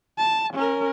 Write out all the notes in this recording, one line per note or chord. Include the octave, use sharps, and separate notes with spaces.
A5
C#4 A#4